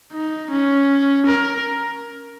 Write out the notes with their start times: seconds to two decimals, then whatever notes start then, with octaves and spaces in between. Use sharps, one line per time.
0.13 D#4
0.51 C#4
1.26 A#4